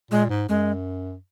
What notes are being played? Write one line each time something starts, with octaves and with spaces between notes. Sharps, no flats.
A#2 G#3
G#2
F#2 G#3